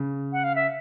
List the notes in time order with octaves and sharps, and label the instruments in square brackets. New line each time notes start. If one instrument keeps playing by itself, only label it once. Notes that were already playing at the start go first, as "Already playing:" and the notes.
Already playing: [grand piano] C#3
[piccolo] F#5
F5
E5